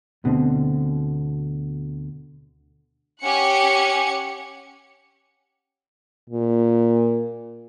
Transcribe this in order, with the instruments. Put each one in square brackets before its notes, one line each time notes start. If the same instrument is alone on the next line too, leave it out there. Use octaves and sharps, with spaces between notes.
[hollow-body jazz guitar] D2 B2 D3 C4
[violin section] C#4 G4 F#5 G#5 C#7
[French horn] A#2